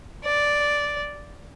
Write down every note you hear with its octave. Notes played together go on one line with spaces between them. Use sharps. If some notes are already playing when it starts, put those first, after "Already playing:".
D5